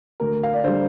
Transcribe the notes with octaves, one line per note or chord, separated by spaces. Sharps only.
D2 A#4
F5
D5
D3 G3 C5